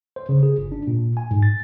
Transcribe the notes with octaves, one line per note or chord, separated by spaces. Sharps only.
C5
C#3
G#4
G1
D4
A#2
G#5
G#2
A6